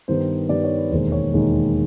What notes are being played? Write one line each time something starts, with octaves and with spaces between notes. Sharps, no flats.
G2 D#3 G3 B3 C5
G2 D#3 G3 B3 D5
C#5
B4
E1 D#2 D#3 G#3 C5
C#5
E1 D#2 D#3 G#3